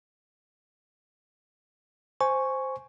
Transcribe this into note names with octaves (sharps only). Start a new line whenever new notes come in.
C5 G#5 C#6